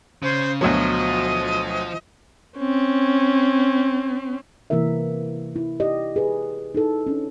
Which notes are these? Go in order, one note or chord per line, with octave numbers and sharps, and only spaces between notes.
C#3 C5
D2 B2 F3 F#3 D#5
C4 C#4
C3 E3 A#3 E4 A#4 E5
E4
G4 D5 D#5
G#4 B4
D#4 E4 A4
C#4 D4